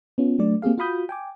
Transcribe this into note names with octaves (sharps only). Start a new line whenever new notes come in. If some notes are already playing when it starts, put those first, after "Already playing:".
B3 C#4 F4
F#3 A3 D4 D5
A#3 C4 G4 G#4 F5
F4 F#4 F5 B5 D#6 G6
G5 G#5 D6